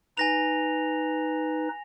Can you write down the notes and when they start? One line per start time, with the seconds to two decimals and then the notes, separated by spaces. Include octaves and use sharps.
0.17 D#4 B4 G#5 A#6 F7